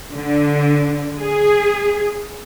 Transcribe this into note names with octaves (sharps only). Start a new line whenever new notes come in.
D3
G#4